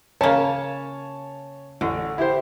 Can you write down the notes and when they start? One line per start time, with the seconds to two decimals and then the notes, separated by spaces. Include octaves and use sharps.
0.21 C#3 A#3 C#5 G#5 A5
1.81 A1 D3
2.18 E4 G4 C5